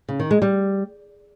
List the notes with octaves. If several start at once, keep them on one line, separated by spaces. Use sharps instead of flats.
C#3
D#3
G#3
G3